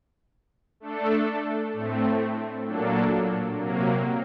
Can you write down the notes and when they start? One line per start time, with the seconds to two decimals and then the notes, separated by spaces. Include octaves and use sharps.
0.80 A3 D4 A4
1.73 A2 A3 C4
2.65 A#2 F#3 A#3 D4 A4
3.58 C3 F#3 A#3